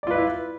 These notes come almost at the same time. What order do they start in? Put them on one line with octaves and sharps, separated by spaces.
D5 F4 B4 E4